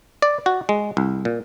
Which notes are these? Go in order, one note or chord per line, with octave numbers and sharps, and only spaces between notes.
D5
F#4
G#3
C2
A#2